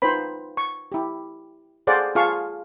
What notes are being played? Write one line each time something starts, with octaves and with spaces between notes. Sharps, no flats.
D#4 F4 B4 C5 B5
C#6
E4 G4
G#4 A4 C5 D5 F5 F#5
F4 G#4 F5 A5 C#6